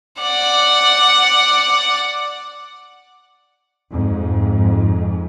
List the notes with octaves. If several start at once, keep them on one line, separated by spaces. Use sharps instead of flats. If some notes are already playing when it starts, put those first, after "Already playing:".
D5 F#5
F2 G#2